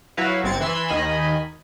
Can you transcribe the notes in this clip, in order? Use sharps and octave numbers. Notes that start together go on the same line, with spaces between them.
F#3 E4 F#4 B4 F5
G1 C4 G#6 A6 C#7
E3 B5 C6 E6 G#6
D#2 D#3 D#5 G#5 B5